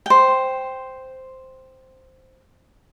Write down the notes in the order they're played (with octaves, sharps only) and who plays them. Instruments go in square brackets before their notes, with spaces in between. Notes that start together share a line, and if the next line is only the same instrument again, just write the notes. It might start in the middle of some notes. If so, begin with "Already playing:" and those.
[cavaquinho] C5 G5